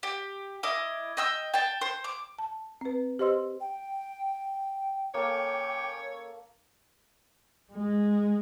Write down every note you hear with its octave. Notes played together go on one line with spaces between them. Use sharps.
G4
E4 D#5 D6
D#5 G5 E6
G5 A5
C5
D6
A5
C4 B4
G4 C5 D#5 C6 E6
G5
A#3 C#4 A4 C#5 G5 D6
G#3